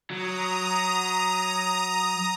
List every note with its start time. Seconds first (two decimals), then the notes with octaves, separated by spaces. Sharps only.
0.10 F#3 A#5 D#6